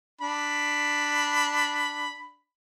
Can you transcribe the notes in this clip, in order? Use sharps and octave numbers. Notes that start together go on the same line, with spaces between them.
D4 B5